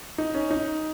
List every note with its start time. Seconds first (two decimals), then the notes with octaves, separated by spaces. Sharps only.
0.18 D#4
0.34 C#4
0.51 D#4